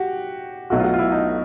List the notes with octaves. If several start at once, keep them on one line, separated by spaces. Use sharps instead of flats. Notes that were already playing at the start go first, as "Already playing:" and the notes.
Already playing: F#4 G4
B1 B2 F#3 A3 F#4
F4
F#4
F4
E4
D#4